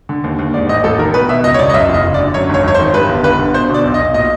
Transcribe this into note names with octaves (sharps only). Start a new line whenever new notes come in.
D3
D#2
D#2
G#2 D5
A1 D#5
A1 A4
D#3 A#4
B2 B4
B2 E5
C#2 D#5
C#5
C#2 D5
D#5
F#2 E5
F#1
D#5
F#1
D5
D3
F#2 C#5
G#1 C#5
G#1 C#5
C5
D#3
G2 B4
G1
G1 B4
D3
B2 C5
B2 D5
B1
D#5
B1
A#2 D#5